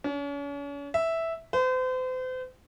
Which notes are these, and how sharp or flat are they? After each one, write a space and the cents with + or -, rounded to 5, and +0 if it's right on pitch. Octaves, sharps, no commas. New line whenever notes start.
C#4 +40
E5 -5
C5 -40